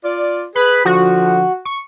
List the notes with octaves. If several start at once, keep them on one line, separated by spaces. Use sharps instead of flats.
F4 D5
G#4 B4 B5
D3 F3 F#4
C#6